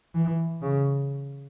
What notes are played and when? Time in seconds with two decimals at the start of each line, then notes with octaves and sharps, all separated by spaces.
0.15 E3
0.62 C#3